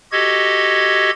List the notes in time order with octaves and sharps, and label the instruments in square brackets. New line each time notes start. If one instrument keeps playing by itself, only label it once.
[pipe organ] F#4 G4 A4 D#5 G#6